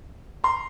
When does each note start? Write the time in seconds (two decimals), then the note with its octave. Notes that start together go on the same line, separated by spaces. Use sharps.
0.44 A#5 C6